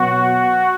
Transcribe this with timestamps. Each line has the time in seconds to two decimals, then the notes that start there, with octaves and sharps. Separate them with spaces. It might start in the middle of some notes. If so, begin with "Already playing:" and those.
Already playing: B2 F#3 B3 F#4